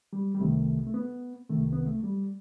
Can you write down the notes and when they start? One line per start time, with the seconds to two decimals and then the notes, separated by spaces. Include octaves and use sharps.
0.13 G3
0.35 G3
0.39 C2 C3 D#3 A3
0.87 A3
0.94 B3
1.49 C2 C3 D#3 A3
1.73 B3
1.86 A3
2.03 G3